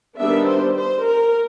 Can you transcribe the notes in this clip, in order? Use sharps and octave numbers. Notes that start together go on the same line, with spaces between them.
D#3 G3 B3 D4 E5
C5
C5
A#4